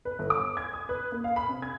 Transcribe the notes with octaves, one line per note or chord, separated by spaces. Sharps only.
B4
G1
D6
G#6
D#6
B4
A#3
F5
B5
C3
G#6